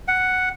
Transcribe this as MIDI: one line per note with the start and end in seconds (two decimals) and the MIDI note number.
0.08 0.49 78